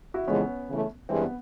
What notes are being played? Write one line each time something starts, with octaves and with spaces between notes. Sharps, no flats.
E4 F#4
F2 C#3 E3 G#3 B3 C#4
C#3 E3 A3
G2 E3 G#3 C4
B3